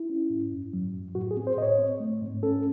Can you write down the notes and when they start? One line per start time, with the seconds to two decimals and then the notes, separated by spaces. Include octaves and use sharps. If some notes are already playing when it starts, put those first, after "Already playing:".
Already playing: E4
0.10 C#4
0.30 G#2
0.52 F#2
0.73 F#3
0.93 F#2
1.15 A2 F#4
1.31 G#4
1.37 C4
1.47 C5
1.57 A2 D#5
1.62 C#5
1.79 C4
2.00 A3
2.22 G#2
2.43 C#4 A4